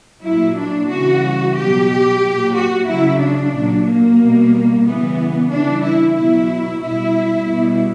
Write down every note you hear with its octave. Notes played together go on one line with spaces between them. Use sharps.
A#2 F#3 E4
D4
C#3 E3 G3 F#4
B2 F#3 G4
A#2 F#3
F#4
C#3 F#3 E4
D4
A#2 F#3
A#3
B2 G3
C#3 E3 G3 B3
C#3 E3 G3 D4
E4
B2 F#3 E4
B2 G3 E4
B2 G3